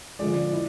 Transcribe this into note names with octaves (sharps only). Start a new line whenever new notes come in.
D3 F3 G#3 D5
E4